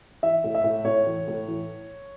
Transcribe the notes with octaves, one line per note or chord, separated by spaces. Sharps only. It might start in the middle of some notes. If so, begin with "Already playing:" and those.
E3 E5
A2
E5
A2
A2 C#5
E3
A2
E3